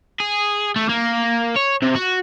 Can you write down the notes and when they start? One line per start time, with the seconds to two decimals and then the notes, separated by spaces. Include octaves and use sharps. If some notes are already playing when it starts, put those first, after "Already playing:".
0.20 G#4
0.76 A3
0.89 A#3
1.56 C#5
1.82 C3
1.96 F#4